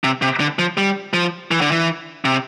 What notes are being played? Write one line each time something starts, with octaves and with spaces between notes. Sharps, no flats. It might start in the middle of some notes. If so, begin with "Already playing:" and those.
C3
C3
D3
F3
G3
F3
E3
D3
E3
C3